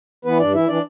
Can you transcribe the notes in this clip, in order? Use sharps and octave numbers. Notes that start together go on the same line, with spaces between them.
E3 B3 B4
G2 D4 D5
E3 E4 E5
E3 D4 D5